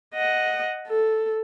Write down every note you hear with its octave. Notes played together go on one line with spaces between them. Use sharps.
D#5 F#5
A4